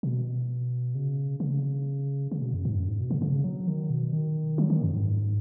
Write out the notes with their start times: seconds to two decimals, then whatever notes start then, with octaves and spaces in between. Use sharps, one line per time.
0.03 B2
0.95 C#3
1.40 C#3
2.31 C#3
2.42 B2
2.54 F#2
2.65 G#2
2.76 F#2
2.88 G#2
2.99 B2
3.11 C#3
3.22 C#3
3.44 F#3
3.68 D#3
3.90 B2
4.13 D#3
4.58 F#3
4.70 D#3
4.82 F#2
4.93 G#2